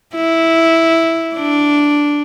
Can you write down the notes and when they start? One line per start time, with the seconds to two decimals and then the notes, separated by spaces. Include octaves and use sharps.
0.15 E4
1.35 D4